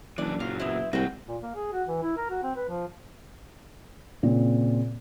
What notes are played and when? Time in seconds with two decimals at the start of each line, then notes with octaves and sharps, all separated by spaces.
0.18 F#1 E3 D4 D5
0.40 A#2 F#3 F4
0.60 B3 C4 E4
0.93 C2 C3 G#3 A#3 F#4 G5
1.28 A#2
1.42 A#3
1.55 G#4
1.72 F#4
1.88 E3
2.02 E4
2.17 A#4
2.30 F#4
2.43 C4
2.56 B4
2.69 F3
4.23 A#2 C#3 C4